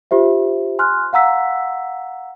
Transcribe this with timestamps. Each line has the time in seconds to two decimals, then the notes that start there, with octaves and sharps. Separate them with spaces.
0.11 F4 G4 C5 E5
0.79 G#5 C6 F6 F#6
1.13 F5 F#5 A#5 E6 B6